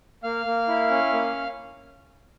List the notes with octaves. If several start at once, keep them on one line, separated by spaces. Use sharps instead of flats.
A#3 F5 F6
A#3
E4
C#4
A#3